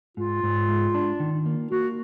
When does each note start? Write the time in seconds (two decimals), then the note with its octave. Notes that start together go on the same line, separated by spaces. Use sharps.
0.17 G#2 F4
0.43 G#2
0.69 G#3
0.94 D4
1.20 D#3
1.46 A#3
1.71 A#3 F#4